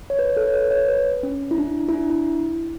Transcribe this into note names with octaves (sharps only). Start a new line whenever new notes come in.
C#5
B4
A4
C#5
B4
C#5
B4
C#4
E4
D4
E4
D4
E4